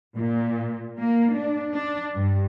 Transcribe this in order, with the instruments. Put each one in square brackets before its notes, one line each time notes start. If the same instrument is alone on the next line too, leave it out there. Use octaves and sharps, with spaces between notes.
[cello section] A#2
A#3
D4
D4
G2